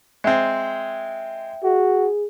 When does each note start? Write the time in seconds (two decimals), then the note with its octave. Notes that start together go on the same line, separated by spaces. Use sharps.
0.24 G#3 C4 E5 G5
1.64 F#4 G#4